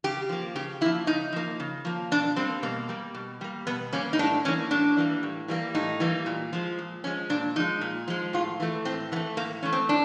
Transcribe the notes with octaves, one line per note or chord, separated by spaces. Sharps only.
C#3 G4
F3 A#3
C#3 G4
F3 A#3 E4
C#3 D#4
F3 A#3
C#3
F3 A#3
B2 D4
G3 A#3 C4
B2 A#3
G3 A#3
B2
G3 A#3
B2 B3
G3 A#3 C#4
D#4
A2 D4
E3 G3 A#3 C#4
A2 D4
E3 G3 A#3
A2
E3 G3 A#3
A2 D#4
E3 G3 A#3
A#2
F3 G#3
A#2
F3 G#3 C#4
A#2 D4
F3 G#3 D#4
A#2
F3 G#3
A2 F4
E3 A3
A2 C4
E3 A3 B3
A2 A#3
E3 A3 C#4
C4
A2 D4